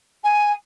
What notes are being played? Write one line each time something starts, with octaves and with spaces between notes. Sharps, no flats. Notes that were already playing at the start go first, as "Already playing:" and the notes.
G#5